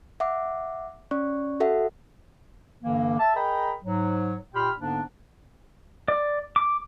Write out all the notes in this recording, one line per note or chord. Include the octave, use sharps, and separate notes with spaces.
E5 F#5 D6
C#4 D5 C#6
F#4 A4 E5 F#5
G2 D3 E3 A#3
E5 A5
G#4 A#4 D#5 G5 A#5 B5
G#2 F#3
A#2 G4 G5 B5 C6 F6
G#2 D3 A#3 B3 D4
D5
D6